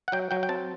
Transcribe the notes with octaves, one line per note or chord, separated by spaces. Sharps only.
F#5
F#3 G5
F#3 G5
G5
C4 A5